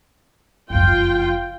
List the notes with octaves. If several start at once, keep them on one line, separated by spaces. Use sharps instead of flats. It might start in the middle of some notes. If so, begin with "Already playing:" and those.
F#1 F2 F4 G5